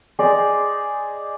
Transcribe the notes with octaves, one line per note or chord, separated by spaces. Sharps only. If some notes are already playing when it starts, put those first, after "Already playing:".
G#4 C5 D5 D#5